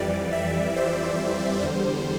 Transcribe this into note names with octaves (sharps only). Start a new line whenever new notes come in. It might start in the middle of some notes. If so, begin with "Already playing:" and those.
Already playing: F2 E3 G3 D5
E5
C5
E2 D3 G3